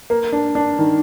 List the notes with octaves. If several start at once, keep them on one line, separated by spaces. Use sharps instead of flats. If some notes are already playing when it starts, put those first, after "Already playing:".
A#3
D4
D4
D#3